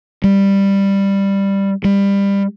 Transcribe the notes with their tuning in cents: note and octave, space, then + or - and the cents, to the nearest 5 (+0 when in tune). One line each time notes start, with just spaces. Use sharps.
G3 +10
G3 +25